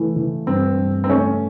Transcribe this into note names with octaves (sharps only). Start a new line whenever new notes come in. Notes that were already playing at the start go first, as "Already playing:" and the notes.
Already playing: E3 A3
E3
G2 C4
G2
C4
A3 C#4